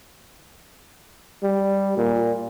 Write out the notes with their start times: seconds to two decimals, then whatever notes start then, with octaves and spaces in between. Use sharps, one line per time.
1.43 G3
1.97 A#2